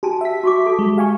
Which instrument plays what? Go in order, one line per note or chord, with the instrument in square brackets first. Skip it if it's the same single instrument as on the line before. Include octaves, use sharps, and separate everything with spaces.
[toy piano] F#4 G#5 A5 [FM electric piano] G4
[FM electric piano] E5 B6
[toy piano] F#4 C#6 D6
G4 A4 A5
[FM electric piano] G#3
F5 G#5 C#6